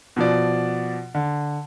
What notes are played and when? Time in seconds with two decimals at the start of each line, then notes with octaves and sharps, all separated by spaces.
0.16 B2 F3 D5
1.15 D3